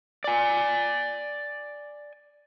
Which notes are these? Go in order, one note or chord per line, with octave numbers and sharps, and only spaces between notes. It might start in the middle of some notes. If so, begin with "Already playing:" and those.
D5 G#5